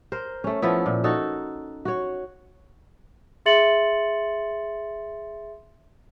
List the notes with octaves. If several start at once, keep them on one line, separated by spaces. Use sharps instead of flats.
A#4 C5
A3 C#4
F3 A3 B3 E4
A#2
D#4 F#4 A4
F#4 C#5
G#4 E5 C6 A6 C#7 F#7